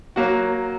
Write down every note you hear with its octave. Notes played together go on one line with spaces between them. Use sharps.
F#3 A#3 F#4